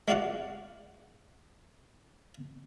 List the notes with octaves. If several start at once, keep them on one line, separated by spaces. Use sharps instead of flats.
G#3 E4 F#4 D5 F5 F#5